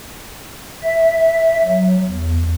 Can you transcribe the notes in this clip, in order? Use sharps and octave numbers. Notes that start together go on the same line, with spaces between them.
E5
F#3
E2